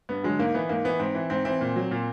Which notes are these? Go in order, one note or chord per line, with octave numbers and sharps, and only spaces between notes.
G2 B3
D3 F#3 G#3
G#2 A#3
E3 B3
G#2 A#3
E3 B3
G#2 C4
E3
G#2 C4
E3 C4
A#2
F#3
A#2